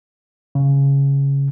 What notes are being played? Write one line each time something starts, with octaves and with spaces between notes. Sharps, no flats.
C#3